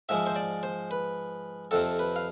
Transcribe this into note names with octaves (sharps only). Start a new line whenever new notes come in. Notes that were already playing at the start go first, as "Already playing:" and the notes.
G#2 F3 G#3 E5
C5
D5
C5
B4
F2 C3 F3 A4
B4
F5